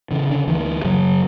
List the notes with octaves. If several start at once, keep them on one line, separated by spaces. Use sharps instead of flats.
C#3 E3
D3
D2 E3
F#2 C#3 F#3